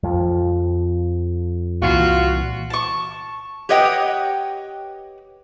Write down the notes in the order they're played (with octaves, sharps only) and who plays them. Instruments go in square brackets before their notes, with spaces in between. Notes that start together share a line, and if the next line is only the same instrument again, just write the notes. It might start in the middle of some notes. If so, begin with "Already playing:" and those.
[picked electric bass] F2 F3
[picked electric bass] C2 A#2 E3 [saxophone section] F4 F#4
[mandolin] A5 C#6
[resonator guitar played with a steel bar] G4 B4 C#5 D#5 F#5 G5